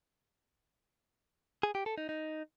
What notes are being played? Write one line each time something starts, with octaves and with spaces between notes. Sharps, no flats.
G#4
G4
A4
D#4
D#4